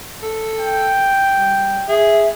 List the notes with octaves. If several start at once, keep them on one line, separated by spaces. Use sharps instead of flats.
A4
G5
G3
G#4 E5